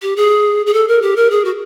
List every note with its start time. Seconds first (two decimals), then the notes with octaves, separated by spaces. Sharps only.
0.02 G4
0.16 G#4
0.66 G#4
0.73 A4
0.88 A#4
1.02 G4
1.16 A#4
1.31 G#4
1.45 F#4